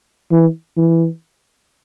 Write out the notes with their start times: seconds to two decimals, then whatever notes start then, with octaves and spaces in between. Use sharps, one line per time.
0.31 E3
0.77 E3